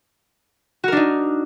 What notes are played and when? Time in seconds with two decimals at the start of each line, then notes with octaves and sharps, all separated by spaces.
0.84 F#4
0.88 A#4
0.92 D4
0.97 D#4